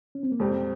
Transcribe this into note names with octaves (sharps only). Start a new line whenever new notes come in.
C#4
C4
A#3
F2 C3 G3 G#3 C4